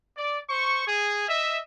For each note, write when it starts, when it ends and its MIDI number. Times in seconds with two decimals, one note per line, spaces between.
0.16 0.39 74
0.48 0.85 72
0.48 0.85 85
0.86 1.24 68
1.28 1.59 75
1.28 1.59 76